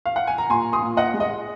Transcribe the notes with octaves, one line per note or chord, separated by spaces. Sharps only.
F5
F#5
G#5
A#5
A#2 G#5 C6
C6 D#6
A#2
D#5 F#5
G#3
D#5